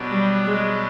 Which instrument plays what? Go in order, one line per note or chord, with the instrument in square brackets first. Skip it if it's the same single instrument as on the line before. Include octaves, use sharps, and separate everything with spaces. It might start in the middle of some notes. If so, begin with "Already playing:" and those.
Already playing: [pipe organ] B2 F#3 B3 D4 G4
[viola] G3
G#3